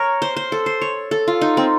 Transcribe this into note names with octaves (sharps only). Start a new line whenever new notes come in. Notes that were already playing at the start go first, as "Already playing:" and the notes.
Already playing: A#4 C#5
C5
C5
A4
C5
C#5
A4
F4
D#4
C4